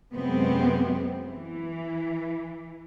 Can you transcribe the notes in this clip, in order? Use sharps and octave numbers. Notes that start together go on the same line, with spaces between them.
F#2 C3 G#3 B3 C4
E3